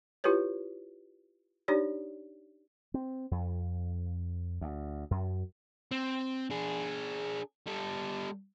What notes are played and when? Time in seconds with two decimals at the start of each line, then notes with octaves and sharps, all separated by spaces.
0.24 E4 F4 G4 G#4 B4 C#5
1.68 D4 D#4 G4 C#5 D5
2.94 C4
3.31 F2
4.61 D2
5.11 F#2
5.91 C4
6.50 D4 G#4
7.67 G3 A4